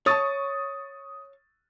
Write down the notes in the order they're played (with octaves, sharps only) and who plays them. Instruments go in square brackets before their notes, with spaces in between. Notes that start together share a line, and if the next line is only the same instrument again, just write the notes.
[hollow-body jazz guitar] C#5 A5 [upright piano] C#6 D#6 A6